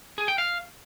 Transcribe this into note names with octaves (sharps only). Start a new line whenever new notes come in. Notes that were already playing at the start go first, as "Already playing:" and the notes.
G#4
G5
F5